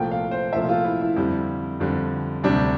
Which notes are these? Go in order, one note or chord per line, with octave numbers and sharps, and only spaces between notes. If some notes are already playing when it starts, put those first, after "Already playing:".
Already playing: C2 A#2 F3 A3 G5
F5
C5
C2 A#2 F3 A3 E5
F4
E4
E4
F2 D3 G3
F2 D3 G3
D2 C3 G3 D4